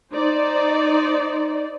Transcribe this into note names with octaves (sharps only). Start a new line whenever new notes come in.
D#4 C5 D5